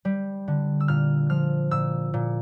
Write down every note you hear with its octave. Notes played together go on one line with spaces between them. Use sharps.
G3
D3
E6
A#2 F6
F3 F6
A#2 E6
A#2